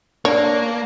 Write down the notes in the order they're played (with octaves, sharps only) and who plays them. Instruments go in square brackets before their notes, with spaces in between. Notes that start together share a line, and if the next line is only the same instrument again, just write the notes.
[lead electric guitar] A#3 [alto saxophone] D4 [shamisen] C#5